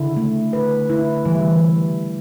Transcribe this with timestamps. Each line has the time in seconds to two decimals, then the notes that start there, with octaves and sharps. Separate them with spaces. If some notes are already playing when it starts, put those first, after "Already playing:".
Already playing: D3 E4
0.17 A3
0.53 B4
0.90 E4
1.25 E3 G3